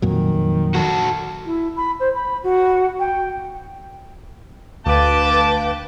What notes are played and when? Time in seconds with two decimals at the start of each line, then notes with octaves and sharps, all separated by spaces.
0.02 F2 A#2 D#3 F#3
0.75 F#4 A4
1.46 E4
1.76 B5
2.00 C5
2.15 B5
2.44 F#4
2.99 G5
4.86 D2 B4 F5 G5 A5 D6